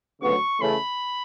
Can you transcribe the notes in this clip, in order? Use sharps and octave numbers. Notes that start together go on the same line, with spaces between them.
D2 C#3 F#3 B3 F#4 C#6
C#3 E3 A3 C#4 B5